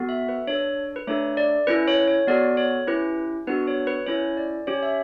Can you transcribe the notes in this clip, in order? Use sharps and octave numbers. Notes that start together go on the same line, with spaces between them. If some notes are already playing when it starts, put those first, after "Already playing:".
Already playing: B3 F#4 A4
E5
B4
D4 A4 C#5
B4
A3 D4 A4 C#5
D5
C#4 E4 A4 B4
C#5
C#5
B3 F#4 A4 D5
C#5
C#4 E4 G4 B4
B3 D4 F#4 A4 B4
C#5
B4
C#4 E4 A4 C#5
D5
C#4 G4 C#5
E5